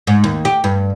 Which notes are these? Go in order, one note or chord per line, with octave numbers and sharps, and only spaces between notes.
G#2
D#2
G4
G2